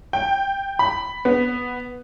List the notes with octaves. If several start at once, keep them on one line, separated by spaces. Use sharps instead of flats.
G5
B5
B3